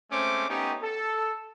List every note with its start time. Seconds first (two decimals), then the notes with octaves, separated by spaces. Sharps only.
0.11 G#3 A3 C4 C#4 C5 D6
0.48 A3 B3 C#4 D#4 G4
0.82 A4